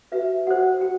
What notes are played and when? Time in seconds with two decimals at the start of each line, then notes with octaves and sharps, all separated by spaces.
0.12 F#4 B4 E5
0.47 F#4 C5 F#5
0.81 F#4 G5